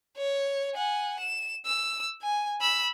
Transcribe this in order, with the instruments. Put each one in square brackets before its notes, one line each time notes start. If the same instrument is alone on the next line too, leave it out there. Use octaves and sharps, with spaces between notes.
[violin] C#5
F#5 G#5
E7
E6
G#5
B5 E6